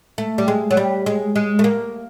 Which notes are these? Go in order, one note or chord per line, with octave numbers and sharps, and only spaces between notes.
A3
G3
G#3
F#3
G3
G#3
G#3
A3
A#3